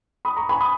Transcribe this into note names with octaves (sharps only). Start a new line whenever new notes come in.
B5 D#6
A#5 C#6
G#5 B5
B5 D#6